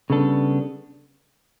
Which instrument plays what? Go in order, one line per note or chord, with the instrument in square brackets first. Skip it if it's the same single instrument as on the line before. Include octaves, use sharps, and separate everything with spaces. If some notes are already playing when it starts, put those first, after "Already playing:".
[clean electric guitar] C#3 G3 B3 D4 A4